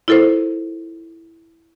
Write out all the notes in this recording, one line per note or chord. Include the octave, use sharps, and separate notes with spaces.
E4 F4 A4 A#4 C5